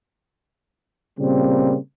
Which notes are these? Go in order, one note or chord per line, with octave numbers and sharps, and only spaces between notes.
A#2 C#3 G3 A#3 C4